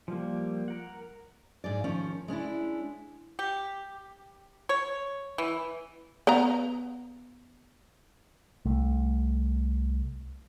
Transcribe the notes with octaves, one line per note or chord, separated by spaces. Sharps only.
F3 G3 A#3
A#4 F#5
G#2 G#4 D5
D#3 F3 C#4
G#3 C#4 D4 E4
G4
C#5
E3
B3 F5 A#5
C2 A3